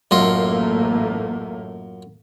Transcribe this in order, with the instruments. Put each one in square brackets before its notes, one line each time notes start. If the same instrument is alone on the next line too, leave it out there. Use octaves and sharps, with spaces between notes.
[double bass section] A1 A3 A#3 [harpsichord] F#2 F4 D#5